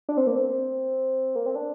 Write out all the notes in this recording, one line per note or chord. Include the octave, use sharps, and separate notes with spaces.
D4
C4
A#3
C4
A#3
C4
D4